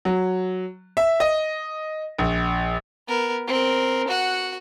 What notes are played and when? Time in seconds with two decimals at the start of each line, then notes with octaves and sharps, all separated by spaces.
0.05 F#3
0.97 E5
1.20 D#5
2.18 A#1
3.08 B3 A#4
3.47 C4 A#4
4.08 F#4 F#5